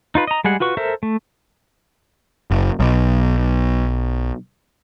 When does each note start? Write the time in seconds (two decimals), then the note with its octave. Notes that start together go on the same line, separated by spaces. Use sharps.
0.15 D#4 F4 B4
0.27 D#5 A#5
0.44 G3 G#3 G#4 F#5
0.60 F4 F#4 B4 C#6
0.77 A4 A#4 C5 E5
1.03 A3
2.51 F#1
2.80 B1